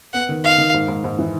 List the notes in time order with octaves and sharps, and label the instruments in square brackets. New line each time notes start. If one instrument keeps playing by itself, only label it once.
[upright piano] B3 [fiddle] F#5
[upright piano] D#3
[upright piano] D#4 [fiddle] F5
[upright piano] D#3
G#2
G#2
G#2
E3